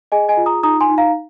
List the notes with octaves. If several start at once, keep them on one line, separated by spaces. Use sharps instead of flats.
G#4 D#5 G#5
D#5 G#5
F4
A#5 D#6
D#4 A#5 D#6
G#5 C6
D#4
F5 A#5